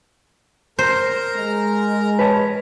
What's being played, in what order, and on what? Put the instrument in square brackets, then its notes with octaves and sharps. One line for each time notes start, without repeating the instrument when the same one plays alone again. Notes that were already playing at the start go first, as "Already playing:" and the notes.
[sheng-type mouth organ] A#4 A#5 [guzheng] C5
[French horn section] G#3
[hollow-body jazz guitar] B4 C#5 A5